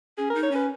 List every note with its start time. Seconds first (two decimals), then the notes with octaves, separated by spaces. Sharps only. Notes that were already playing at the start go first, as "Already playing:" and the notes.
0.18 C#4 G#4
0.30 D#4 A#4
0.43 C#5
0.51 C#4 B4